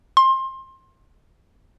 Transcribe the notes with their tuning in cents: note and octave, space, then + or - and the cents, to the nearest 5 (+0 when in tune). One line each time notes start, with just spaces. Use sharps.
C6 +25